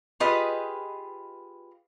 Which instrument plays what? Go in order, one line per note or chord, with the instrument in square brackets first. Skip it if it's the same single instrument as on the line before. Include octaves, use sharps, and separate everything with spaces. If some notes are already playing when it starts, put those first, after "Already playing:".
[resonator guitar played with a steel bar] F4 G4 G#4 B4 D#5